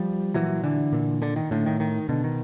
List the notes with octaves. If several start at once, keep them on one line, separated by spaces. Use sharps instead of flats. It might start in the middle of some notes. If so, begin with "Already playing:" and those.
Already playing: F3 G3
A#2 E3 F#3
D3 E3
A#2
D3
D#3
A2 D3
D#3
D#3
B2 D3
D#3